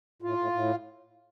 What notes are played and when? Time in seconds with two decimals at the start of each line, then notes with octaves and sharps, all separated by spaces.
0.22 A2 F4
0.38 A2
0.52 A2